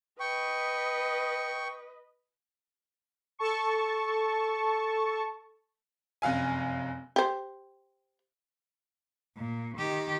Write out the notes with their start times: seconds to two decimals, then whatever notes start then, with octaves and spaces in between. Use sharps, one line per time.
0.20 B4 D#5 G5 C#6
3.39 A4 A5 C#6
6.22 F1 F#2 F5 G#5
7.16 G4 C5
9.37 A#2
9.78 D#3 G4